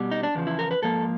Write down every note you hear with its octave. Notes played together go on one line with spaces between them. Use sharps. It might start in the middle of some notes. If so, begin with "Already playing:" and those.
Already playing: B2 G3
D#4
D4
E2 C#3 F3
E4
A#4
B4
G#2 F3 A#3 A4